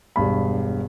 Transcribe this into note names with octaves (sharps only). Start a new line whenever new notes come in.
E1 G2 B5